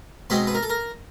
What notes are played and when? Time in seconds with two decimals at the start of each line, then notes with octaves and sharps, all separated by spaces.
0.30 B2 G#3 C4 D#4 B4
0.47 B4
0.55 A#4
0.63 A4
0.70 A#4